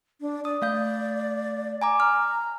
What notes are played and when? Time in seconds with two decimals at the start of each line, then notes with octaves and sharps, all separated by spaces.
0.21 D4
0.45 D5 D#6
0.62 A3 D5 F5 G6
1.81 G#5 A#5 D6
2.00 A#5 F6